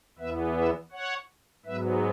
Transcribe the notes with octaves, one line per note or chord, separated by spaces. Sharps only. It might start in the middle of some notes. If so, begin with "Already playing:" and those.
E2 E3 B3 B4 E5
B4 E5
C#5 F#5
G#2 F#3 B3 B4 E5